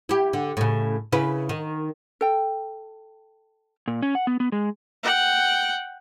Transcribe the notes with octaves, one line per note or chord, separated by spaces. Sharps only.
E4 G4
D3
A2 C#3
C#3 E4 B4
D#3
A4 G5
A#2
C#4
F#5
B3
B3
G#3
F#5 G5